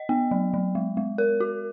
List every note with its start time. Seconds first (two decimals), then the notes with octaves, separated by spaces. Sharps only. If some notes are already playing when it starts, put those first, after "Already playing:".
Already playing: D#5
0.09 B3
0.31 F#3
0.54 F#3
0.75 G#3
0.97 G#3
1.18 A#4
1.40 F#4